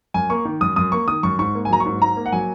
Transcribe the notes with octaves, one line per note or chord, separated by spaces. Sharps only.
F#2 G#5
A#3 C#6
D#3
F#2 D#6
F#2 D#6
A#3 C#6
D#3 D#6
F#2 C#6
G#2 C#6
A#3
G#5
F#3 A#5
C#6
G#2
G#2 A#5
A#3
F#5
F#3 G#5